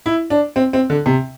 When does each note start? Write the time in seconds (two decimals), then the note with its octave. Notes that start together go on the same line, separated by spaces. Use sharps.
0.06 E4
0.30 D4
0.56 C4
0.73 C4
0.90 D3
1.06 C3